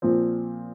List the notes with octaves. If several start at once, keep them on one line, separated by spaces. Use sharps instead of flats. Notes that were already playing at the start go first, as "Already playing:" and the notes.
A#2 F3 C4